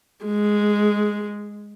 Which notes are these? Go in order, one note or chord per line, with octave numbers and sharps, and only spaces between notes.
G#3